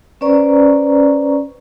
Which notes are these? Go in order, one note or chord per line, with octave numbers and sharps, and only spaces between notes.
C#4 B4 C5 D5 A#5 C#6